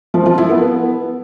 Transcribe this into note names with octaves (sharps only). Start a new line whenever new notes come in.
F3
F3
E4
B3
B3